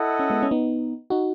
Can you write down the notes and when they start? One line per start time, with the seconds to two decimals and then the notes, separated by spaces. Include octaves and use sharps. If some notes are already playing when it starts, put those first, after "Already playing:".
Already playing: E4 A4 D#5 F#5
0.19 C#4
0.30 G#3 B3
0.43 C#4
0.51 B3 D#4
1.10 D#4 F#4